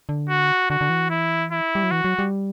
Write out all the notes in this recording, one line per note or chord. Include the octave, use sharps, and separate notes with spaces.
D3
F#4
D3 F#4
D3
E3
E4
E4
G3
F#3
E3 F#4
F#3
G3